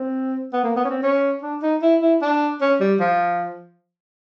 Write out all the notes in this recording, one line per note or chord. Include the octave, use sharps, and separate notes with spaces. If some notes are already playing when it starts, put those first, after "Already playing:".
Already playing: C4
B3
A#3
B3
C#4
C4
C#4
D4
D#4
E4
E4
D4
C#4
G3
F3